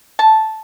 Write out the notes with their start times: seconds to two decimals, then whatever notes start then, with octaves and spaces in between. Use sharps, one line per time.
0.19 A5